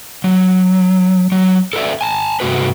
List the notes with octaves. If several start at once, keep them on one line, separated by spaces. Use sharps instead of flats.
F#3
F#3
A4 B4 C5 D5 E5
G#5 A5
G2 C3 A3 F#4 B4